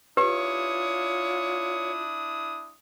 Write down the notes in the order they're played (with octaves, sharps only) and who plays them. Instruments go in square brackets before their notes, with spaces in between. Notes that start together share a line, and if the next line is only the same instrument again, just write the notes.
[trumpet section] D4 E4 D#6 [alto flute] F4 [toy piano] G4 B4 [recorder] C#5